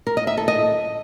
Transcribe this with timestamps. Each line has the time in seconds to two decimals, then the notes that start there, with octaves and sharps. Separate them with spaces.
0.07 A#4
0.17 D#5
0.27 E5
0.37 A4
0.48 D#5